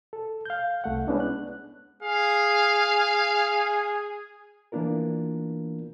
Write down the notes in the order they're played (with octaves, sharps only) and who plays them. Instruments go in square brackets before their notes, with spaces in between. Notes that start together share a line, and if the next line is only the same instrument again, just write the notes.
[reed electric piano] A4
F5 G6
C2 A3 F#5
G#3 B3 C#4 D4 E4
F#6
[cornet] G#4 [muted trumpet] F5
[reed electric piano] E3 A#3 B3 D4 F4 A#4